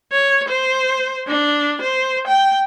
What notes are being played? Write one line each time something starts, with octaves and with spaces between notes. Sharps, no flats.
C#5
C5
D4
C5
G5